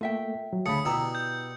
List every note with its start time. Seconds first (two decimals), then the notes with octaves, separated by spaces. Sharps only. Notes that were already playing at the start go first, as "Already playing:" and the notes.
0.01 A3 A#3 F4 E5 G5
0.53 F#3
0.66 D2 C#3 A5 B5 D#6 C#7
0.85 B2 B3 E4 G4 D5 A#5 E6
1.15 G6